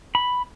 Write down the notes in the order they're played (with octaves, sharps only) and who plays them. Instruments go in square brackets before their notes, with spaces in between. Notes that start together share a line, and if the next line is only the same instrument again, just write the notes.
[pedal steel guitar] B5